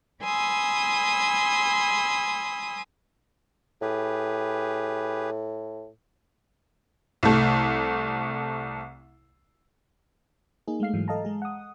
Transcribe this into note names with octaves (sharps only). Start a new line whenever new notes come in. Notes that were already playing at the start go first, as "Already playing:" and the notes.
G#5 B5 C6 D#6 E6
A2 G4 G#4 B4
C2 A3
A#3 D#4 G#4
G#3 A3 F5 C7
G#2 E3 F#3
A4 D#5 F5 A5 A#5
G#3 G#4
F#5 D#6